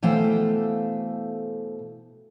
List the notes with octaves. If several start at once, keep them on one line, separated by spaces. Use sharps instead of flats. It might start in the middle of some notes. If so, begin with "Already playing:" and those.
B2 E3 A3 C5 F5 G5